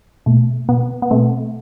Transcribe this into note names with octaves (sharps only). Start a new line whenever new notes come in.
B2 A3
B2 B3
B3
B2 A3 C4